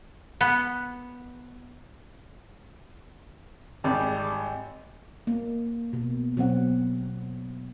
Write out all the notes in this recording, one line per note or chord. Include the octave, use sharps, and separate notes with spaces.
B3
G#1 G3
A#3
B2
B2 F#3 C4 F#5